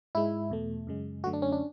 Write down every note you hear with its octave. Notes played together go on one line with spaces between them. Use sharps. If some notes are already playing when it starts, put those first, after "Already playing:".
G#2 G#3 E4
E2 B2 A3
F#2 C#3 G#3
F#2 D3 F#3 A3 F#4
D4
C#4
D4